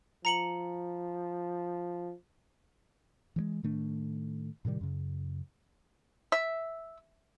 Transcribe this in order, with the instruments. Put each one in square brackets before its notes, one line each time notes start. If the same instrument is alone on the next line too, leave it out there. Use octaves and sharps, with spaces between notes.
[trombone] F3 [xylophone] A#5 C#7 F#7
[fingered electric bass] E3 F3 G#3
A2 D#3 A3 D4
A2 C3 D#3 G3
F#2 C#3
[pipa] E5